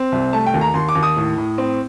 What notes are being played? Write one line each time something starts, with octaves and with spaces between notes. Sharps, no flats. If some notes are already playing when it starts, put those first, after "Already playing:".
Already playing: C4
C2
A3 A5
G5
D#2
A#5
D#2 C6
D6
D#2
D#6
A2
A2
C4